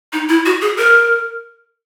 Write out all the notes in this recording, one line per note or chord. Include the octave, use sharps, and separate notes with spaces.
D#4
E4
F#4
G#4
A#4